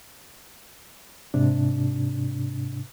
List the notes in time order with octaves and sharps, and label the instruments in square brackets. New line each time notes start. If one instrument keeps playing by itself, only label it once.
[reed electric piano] G#2 C3 D4